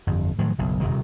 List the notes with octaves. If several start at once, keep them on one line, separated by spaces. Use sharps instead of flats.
G1 F2
A2 D#3 F3 F#3
F#1 B1
D#1 C#2 C3 D#3